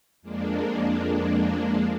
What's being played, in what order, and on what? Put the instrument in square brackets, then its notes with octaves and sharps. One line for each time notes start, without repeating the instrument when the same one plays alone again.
[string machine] F2 G#3 A#3 D4